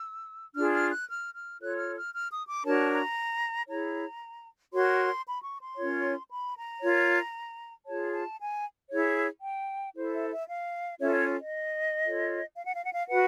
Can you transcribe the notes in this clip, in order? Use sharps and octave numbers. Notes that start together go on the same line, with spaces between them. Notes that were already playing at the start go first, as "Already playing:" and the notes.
Already playing: E6
D4 F4 G#4 F6
F6
F#6
F6
F6
F4 A4 C#5 F#6
F6
F6
F6
D#6
D6
D4 F#4 A#4 C#5 A5
A#5
E4 G#4 C#5 A#5
F#4 A#4 C#5 C6
B5
C#6
C6
C#4 F4 A#4 C#5
B5
A#5
F4 A#4 C#5
F4 G#4 C#5 A5
A5
G#5
E4 G#4 C#5
G5
E4 A4 C5
E5
E5
F5
C#4 F4 A4 C#5 E5
C#5
D#5
F4 A4 C#5
F5
F#5
F5
F#5
F5
F#4 B4 F#5